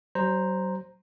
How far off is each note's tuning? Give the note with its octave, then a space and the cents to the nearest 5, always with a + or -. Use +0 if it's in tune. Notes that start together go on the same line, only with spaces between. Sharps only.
F#3 +40 C5 +0 A#5 +0